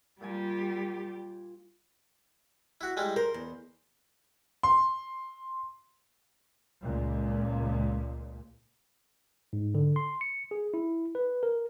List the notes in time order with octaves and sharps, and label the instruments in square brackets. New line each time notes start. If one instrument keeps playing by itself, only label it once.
[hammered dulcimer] A#2 F4 G#5 [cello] G3 G4
[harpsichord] E4 F#4
G3 G#3 E4
[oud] A#4 [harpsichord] C5
[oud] E2
[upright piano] C6
[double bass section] C#2 A#2
[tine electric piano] G#2
D3
C6
C#7
G#4
E4
B4
A#4